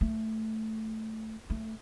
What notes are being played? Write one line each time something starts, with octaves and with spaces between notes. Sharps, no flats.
A3
A3